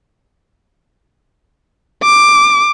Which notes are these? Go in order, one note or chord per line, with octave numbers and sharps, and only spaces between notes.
D6